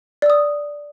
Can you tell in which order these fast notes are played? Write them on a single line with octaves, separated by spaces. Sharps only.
D5 E6 D#6